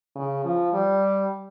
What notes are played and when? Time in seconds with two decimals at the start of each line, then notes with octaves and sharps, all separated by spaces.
0.16 C#3
0.45 F3
0.73 G3